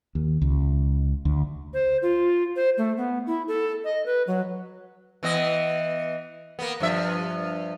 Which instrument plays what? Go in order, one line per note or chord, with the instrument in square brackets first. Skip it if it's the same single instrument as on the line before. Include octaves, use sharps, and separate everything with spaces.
[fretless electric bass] D#2
C#2
D2
[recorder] C5
F4
C5
A3
B3
E4
A4
D#5
B4
F#3
[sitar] E3 B3 D#5
A#3 B3
G2 F3 E5